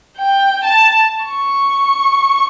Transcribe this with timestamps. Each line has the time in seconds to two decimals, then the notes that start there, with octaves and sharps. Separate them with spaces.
0.17 G5
0.64 A5
1.26 C#6